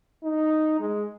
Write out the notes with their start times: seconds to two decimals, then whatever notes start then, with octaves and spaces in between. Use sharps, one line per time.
0.23 D#4
0.80 G#3